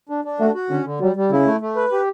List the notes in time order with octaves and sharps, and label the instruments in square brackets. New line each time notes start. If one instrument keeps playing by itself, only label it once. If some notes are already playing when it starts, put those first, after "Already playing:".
[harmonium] D4
D4
[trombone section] A3 [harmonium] F#4
[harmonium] F#4
[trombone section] D3 [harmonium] C#4
[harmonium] D3
[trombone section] F#3 [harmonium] G3
[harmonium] G3
[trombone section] C#3 [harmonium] E4
[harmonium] A3
A3
B4
G4